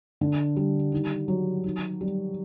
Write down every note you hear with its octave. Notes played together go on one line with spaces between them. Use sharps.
D3
G3
D#3
F#3
D#3
G3